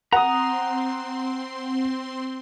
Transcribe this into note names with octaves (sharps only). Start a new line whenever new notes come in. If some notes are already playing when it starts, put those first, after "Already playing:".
C4 F#5 A#5 C6 D#6